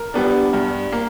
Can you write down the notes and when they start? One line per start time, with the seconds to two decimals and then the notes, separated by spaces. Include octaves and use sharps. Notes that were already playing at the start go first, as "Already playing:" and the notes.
Already playing: A#4
0.14 G3 B3 D4
0.53 G2
0.92 A#3